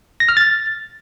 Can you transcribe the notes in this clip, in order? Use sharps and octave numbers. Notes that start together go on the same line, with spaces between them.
A#6
F6
A6